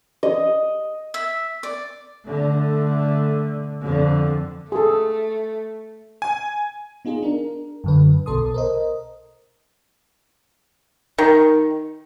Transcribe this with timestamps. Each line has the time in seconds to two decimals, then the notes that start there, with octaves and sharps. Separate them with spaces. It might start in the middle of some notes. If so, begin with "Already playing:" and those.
0.23 D#5
1.14 E5
1.63 D5
2.26 D3 A3
3.82 F2 D3
4.72 A3 G#4 A4
6.22 G#5
7.05 B3 D#4 F4 G#4
7.23 D4 A#4
7.84 F#2 D3 B4
8.26 B1 B2 A4 A5 C6 D#6
8.54 A#4 C5 D#5
11.18 D#3